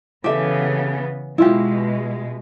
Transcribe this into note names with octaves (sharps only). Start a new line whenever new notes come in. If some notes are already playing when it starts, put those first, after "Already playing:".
C#3 E3 B3 G4 A4 E5
B2 G#3 E4 F4 G4